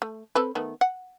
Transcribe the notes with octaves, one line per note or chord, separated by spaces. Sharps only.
A3
C4 A4 B4
D#3 A3 B3
F#5